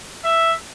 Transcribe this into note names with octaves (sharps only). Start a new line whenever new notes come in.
E5